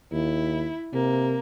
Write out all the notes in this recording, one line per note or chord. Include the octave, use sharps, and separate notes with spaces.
D#2 E4
C3 A#3